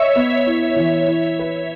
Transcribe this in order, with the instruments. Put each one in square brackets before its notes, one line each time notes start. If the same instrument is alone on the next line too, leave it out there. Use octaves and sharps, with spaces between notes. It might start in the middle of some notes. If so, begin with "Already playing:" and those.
Already playing: [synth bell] C#5 E5 [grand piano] D#5
[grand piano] B3
E4
E3
E4
B4